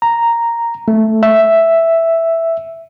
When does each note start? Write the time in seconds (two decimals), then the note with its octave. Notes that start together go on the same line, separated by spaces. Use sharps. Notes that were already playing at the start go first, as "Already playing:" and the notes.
0.02 A#5
0.88 A3
1.23 E5